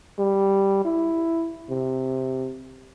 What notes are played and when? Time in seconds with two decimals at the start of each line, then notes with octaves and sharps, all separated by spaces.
0.19 G3
0.85 E4
1.70 C3